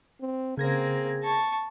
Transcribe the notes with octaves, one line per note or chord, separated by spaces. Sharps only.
C4
C#3 A#3 C4 G#4 G#6 A#6
A5 C#6